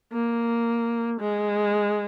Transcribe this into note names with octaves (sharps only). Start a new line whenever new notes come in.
A#3
G#3